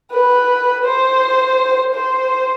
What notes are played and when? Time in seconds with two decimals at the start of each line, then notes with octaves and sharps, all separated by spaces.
0.12 B4
0.85 C5
1.93 C5